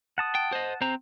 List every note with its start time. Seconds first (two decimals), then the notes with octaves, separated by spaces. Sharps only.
0.18 F#5 A5 D#6
0.35 G5
0.52 C5 D#5
0.82 C4 C5 A#5